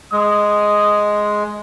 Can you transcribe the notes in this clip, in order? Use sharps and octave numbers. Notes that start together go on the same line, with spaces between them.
G#3 D#6